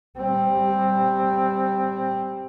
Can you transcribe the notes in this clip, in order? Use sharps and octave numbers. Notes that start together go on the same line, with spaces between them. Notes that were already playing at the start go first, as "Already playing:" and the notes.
G3 C4